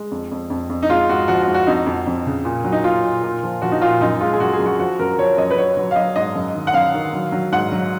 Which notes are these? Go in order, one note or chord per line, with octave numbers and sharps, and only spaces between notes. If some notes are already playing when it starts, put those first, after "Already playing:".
Already playing: G#3
F2
F2
F2
F2
D#4
G#3 F4
G#2 F#4
F3 F#4
F#4
G#2
F#4
F2 D#4
F2
F2
C#3
A#2
F#3
D#4
A#2 F4
A#2
A#2
F3
F3 F#4
D#4
A#2 F4
F#2 D#4
G#3 F4
G#4
F#2 F#4
G#4
F#2
F#4
F3 F#4
F#2 A#4
F3 C#5
F#2 D#5
B4
F#3 C#5
F#3
F5
F#3 D#5
G#2 D#5
F#2
D#3
F#5
F#2 F5
D#3
F#3
F#3
G#2 F#5
F#3